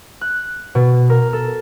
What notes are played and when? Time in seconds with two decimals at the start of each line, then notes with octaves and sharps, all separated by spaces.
0.21 F#6
0.75 B2
1.10 A#4
1.33 A4